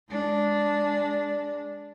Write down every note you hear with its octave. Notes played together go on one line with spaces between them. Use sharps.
G#3 D4